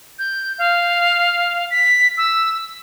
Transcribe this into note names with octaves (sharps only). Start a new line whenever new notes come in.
G6
F5
B6
E6